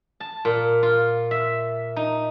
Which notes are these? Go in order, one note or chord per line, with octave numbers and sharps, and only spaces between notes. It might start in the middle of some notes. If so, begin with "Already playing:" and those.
A5
A#2
F4
E5
D#4